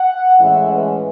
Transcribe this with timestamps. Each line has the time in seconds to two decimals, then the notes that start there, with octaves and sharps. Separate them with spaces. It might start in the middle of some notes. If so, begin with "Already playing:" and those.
Already playing: F#5
0.40 A2 E3 G#3 C#4 E5
0.71 B4